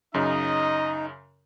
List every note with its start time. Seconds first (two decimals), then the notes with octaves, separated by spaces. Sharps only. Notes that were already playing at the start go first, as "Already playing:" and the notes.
0.14 F#2 C#3 D#4 D#5